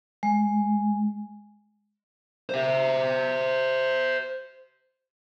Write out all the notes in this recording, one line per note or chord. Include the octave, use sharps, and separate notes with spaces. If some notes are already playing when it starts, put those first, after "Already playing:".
G#3
C5 E5